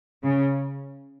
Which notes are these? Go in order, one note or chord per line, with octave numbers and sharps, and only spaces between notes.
C#3